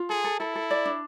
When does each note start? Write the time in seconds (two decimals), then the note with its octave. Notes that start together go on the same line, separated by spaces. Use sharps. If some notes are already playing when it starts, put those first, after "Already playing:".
Already playing: F4
0.10 G#4 A4
0.24 A4
0.40 E4 A4
0.56 A4
0.71 D5
0.85 D4